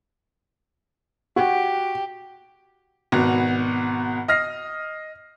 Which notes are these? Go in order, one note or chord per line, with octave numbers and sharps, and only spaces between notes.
F#4 G4
G#1 B2 F#4
D#5 F6 A#6 C7